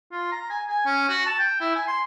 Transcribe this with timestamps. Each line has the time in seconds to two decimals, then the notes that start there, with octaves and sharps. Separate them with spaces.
0.12 F4
0.32 A#5
0.50 G#5
0.69 G#5
0.86 C#4
1.09 F#4
1.26 A5
1.39 G5
1.61 E4
1.76 G#5
1.88 C6